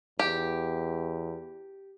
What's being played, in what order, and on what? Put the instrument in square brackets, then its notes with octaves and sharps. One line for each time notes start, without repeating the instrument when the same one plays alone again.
[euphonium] E2 [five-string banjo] G4